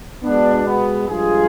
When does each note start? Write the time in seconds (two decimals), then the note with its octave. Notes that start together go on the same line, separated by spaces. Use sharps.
0.24 B2 G#3 B3 D4
0.67 B3
1.09 G2 F3 G#3 F4 G#4